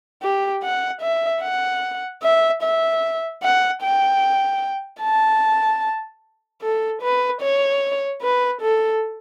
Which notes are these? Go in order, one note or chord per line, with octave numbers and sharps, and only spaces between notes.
G4
F#5
E5
F#5
E5
E5
F#5
G5
A5
A4
B4
C#5
B4
A4